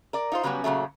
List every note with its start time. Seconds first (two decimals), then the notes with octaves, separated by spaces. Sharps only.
0.13 A#4 D5
0.32 D#4 F4 C5
0.43 C#3 F#3 G3 B3 C#4
0.64 A#2 C#3 F#3 A3